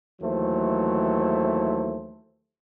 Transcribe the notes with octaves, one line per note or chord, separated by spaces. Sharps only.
D#2 E3 F#3 A3 C5